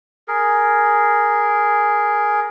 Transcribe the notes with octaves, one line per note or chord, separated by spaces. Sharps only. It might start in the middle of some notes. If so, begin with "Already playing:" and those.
G#4 A#4